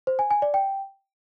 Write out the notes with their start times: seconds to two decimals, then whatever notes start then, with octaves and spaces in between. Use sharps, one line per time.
0.07 C5
0.19 G#5
0.31 G#5
0.42 D5
0.54 G5